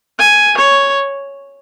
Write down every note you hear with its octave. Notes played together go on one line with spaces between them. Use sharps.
G#5
C#5